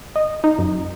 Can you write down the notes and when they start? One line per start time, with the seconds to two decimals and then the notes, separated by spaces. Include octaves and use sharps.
0.16 D#5
0.44 D#4
0.58 F#2